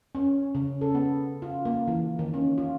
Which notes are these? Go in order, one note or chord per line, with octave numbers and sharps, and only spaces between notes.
C#4
C#3
A4
B3
F4
A#3
E3
D#3
C#4
F4